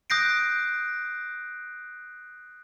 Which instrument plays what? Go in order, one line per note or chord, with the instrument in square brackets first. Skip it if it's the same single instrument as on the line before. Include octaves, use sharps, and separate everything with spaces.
[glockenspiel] D#6 F#6 G6 A#6 C7 D7